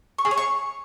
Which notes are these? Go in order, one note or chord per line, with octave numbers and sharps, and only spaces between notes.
C#6
G#4
C#5
C#6